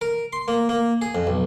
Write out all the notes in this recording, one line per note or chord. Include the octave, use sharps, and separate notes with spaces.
A#4
C6
A#3
A#3
G#4
F2
B1